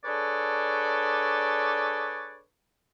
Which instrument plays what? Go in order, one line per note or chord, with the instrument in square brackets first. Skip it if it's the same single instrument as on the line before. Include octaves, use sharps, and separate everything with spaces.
[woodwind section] D4 G#4 A4 B4 C#5 D5